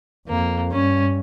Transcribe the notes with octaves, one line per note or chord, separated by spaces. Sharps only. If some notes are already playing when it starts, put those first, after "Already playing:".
F2 A#3
G2 C#4